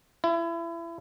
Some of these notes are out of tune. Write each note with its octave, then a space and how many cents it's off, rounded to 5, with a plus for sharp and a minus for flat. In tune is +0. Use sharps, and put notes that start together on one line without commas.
E4 +30